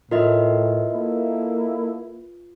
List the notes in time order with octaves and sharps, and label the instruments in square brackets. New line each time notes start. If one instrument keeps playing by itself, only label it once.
[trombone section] A2 [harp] F4 B4 [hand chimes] A#4 D#5 E5
[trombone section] A#3 E4 A4